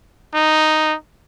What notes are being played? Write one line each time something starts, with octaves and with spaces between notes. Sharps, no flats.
D#4